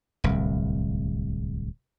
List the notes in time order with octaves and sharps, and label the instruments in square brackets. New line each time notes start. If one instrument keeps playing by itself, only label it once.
[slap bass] D1 C2